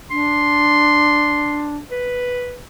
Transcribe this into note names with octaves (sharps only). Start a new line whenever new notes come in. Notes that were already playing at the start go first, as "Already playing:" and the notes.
D4 C6
B4